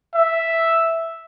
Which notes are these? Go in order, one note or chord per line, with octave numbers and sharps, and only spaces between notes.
E5